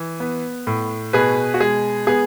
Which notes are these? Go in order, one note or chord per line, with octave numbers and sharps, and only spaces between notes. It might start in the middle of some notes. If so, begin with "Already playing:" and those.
Already playing: E3
B3
A2
B2 G#4 B4
F#4
G#3 G#4
B3 G#4